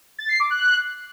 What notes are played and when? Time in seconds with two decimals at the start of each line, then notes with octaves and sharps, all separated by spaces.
0.19 A6
0.29 C7
0.40 D6
0.50 F#6